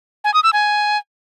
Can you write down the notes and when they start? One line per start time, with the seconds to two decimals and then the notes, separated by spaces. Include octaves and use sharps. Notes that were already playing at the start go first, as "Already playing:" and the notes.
0.24 G#5
0.34 D#6
0.43 E6
0.53 G#5